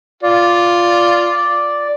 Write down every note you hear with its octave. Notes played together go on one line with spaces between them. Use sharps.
F4 D5